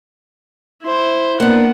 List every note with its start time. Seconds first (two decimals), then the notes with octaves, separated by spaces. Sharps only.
0.83 E4 C5
1.40 A#3 B3 D4 F#5